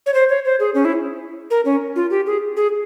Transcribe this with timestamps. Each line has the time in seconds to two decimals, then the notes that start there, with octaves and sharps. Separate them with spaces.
0.06 C#5
0.14 C5
0.29 C#5
0.45 C5
0.60 G#4
0.74 C#4
0.85 E4
1.50 A#4
1.65 C#4
1.96 F4
2.10 G4
2.26 G#4
2.57 G#4